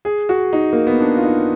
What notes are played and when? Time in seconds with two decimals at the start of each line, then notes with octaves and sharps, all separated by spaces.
0.05 G#4
0.29 F#4
0.53 D#4
0.73 A#3
0.87 B3
1.00 D4
1.17 F4
1.24 D#4